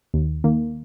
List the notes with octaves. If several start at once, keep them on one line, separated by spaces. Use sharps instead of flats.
D#2
D#3 A#3